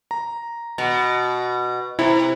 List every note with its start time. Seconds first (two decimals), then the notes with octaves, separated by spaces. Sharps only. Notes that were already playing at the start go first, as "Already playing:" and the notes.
0.11 A#5
0.78 B2
1.99 C3 E4